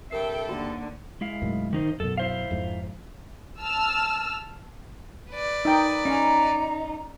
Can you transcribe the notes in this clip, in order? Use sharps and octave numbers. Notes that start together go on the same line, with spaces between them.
G2 C3 A4 A#4 E5 G5 C7
D#2 D3 F#4
G#3 E4 F5
B1 F#2 A2
D#3 D#4 C5
F#2 B2 A4
E4 C5 F5
F2 G#2
A5 E6 F6
B4 D5
D#4 G5
C#4 D#4 A#5